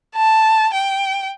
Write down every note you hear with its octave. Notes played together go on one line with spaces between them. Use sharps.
A5
G5